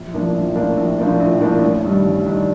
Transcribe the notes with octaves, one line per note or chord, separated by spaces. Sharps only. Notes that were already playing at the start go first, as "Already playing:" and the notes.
Already playing: A#1
A2 F3 A#3 D4
A#1
A2 F3 A#3 D4
A#1
A2 F3 A#3 D4
A#1
A2 F3 A#3 D4
A1
G2 D#3 G3 D4
A1
G2 D#3 G3 D4